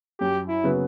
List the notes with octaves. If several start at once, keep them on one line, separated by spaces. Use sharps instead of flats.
F#2 G4
E4
C#3 F#3 B3